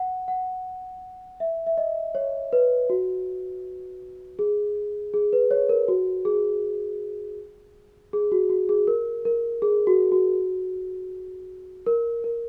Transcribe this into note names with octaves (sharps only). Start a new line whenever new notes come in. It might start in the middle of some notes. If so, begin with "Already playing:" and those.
Already playing: F#5
F#5
E5
E5
D#5
C#5
B4
F#4
G#4
G#4
B4
C#5
A#4
F#4
G#4
G#4
F#4
F#4
G#4
A#4
A#4
G#4
F#4
F#4
A#4
A#4